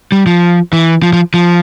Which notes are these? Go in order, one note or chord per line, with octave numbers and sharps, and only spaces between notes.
G3
F3
E3
F3
F3
F3